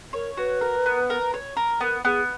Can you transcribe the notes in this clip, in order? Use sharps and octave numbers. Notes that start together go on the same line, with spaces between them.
A#4 C#5
F#4 B4
A#4
B3
A#4
C#5
A#4
B3 A#4
B3 G#4